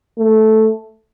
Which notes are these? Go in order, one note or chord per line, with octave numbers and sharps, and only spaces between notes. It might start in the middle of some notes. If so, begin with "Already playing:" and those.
A3